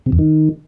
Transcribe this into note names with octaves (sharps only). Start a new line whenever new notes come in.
C3
E2
D#3